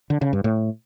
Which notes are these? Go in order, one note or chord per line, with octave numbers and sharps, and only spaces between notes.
D3
C#3
G2
A2